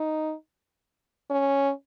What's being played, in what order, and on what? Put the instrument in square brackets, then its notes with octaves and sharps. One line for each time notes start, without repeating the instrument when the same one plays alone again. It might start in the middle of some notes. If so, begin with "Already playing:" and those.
Already playing: [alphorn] D#4
C#4